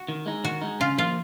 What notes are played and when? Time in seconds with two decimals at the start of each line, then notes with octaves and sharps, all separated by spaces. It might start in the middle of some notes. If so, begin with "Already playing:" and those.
Already playing: F#4
0.08 D#3
0.26 G#3 D#4
0.44 D#3 F#4
0.62 G#3 D#4
0.80 C#3 F4
0.98 F3 A#3 F4